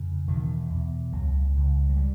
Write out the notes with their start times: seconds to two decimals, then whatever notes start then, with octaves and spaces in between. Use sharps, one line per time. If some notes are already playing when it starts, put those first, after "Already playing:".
Already playing: F2 C#3
0.27 E2 B2 D#3
0.70 E2 B2
1.12 C#2 C#3 F#3
1.55 C#2 C#3
1.89 F#3
1.96 C#3 G3